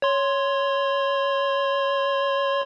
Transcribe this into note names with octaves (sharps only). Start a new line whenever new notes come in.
C#5 C6